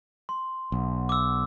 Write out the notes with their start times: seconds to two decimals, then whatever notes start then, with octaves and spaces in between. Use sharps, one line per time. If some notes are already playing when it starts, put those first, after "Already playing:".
0.29 C6
0.72 B1
1.09 D6 E6